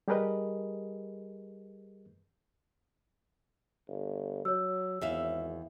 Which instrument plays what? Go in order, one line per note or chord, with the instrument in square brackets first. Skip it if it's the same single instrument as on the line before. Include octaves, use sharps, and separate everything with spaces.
[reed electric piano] G3 G4 G#4 A#4 B4 D#5
[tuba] G1
[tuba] F#3 [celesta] C#5 E6
[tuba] G#1 [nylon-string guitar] E2 E5 F5